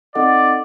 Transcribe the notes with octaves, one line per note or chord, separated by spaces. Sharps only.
C4 D#4 A4 D5 D#5 F#5